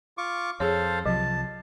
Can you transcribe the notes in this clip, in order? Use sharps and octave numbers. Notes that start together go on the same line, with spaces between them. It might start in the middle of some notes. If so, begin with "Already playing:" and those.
F4 C#6 D6
F2 G#4 A4 C5 C#5 F5
C2 C3 F3 F#3 A5